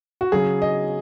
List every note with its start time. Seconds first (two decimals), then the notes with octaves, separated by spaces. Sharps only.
0.21 F#4
0.32 C#3 F#3 G#4
0.62 D#5